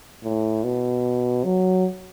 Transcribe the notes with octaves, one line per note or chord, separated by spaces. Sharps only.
A2
B2
F#3